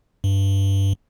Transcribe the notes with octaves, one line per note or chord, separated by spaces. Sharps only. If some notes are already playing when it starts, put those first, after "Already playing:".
G2